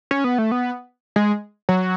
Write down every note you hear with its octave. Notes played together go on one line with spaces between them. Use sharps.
C#4
B3
A3
B3
G#3
F#3